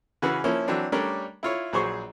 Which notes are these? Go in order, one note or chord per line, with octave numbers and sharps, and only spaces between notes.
C#3 E3 F#4 G#4 B4
F3 A#3 C#4 E4
E3 F#3 C4 D4
G3 A3 C#4 D4 A#4 D5
E4 F4 C#5
A#1 F#3 G#4 C5 C#6